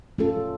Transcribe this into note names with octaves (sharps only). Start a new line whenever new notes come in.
A3 C#4 F4 A4